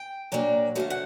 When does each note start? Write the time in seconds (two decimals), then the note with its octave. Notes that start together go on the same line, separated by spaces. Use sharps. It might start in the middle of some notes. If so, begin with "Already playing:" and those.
Already playing: G5
0.32 A#2 F#3 A#3 D4
0.75 F2 D3 F#3 A3 F5
0.90 F#5